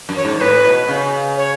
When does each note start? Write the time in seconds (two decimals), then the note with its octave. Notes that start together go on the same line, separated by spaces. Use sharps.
0.09 F#2
0.16 C#5
0.25 G#2
0.36 C#5
0.41 A2 B4
0.65 B2
0.89 C#3
1.37 C#5